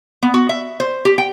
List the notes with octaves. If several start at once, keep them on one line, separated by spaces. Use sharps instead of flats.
B3
F#4
E5
C5
G4
G5